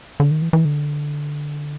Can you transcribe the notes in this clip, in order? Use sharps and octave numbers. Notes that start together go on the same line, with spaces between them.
D3
D#3
E3
E3
D3